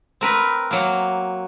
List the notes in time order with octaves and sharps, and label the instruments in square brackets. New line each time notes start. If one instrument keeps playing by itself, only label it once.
[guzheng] C4 A#4 B4
F#3 A#3